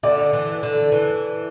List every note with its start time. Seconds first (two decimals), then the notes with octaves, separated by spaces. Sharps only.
0.03 D3 D5
0.33 E3
0.63 D3
0.92 E3